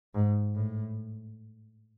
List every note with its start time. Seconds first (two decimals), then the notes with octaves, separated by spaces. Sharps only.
0.15 G#2
0.54 A2